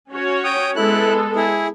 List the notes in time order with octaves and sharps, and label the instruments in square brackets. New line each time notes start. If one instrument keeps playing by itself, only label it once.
[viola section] C#4 F#4 C#5
[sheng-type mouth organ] G5 D#6
[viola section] G#3 B3 A4 [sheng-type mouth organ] E4 F#6
[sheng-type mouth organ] E4 G#4